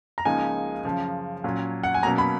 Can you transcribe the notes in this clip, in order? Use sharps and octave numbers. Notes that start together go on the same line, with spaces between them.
A#5
C#2 C#3 F3 A#3 D#4 G#5
F#2 C#3 F3
A#2 F#3 C#4
F#5
G#5
B2 F#3 A#3 C#4 A#5
B5